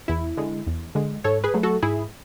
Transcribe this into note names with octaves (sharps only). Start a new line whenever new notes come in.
E2 E4
D3 G#3
E2
D3 G#3
G#2 A4 C#5
G#4 B4
F#3 A3
F#4 A4
G#2 E4 G#4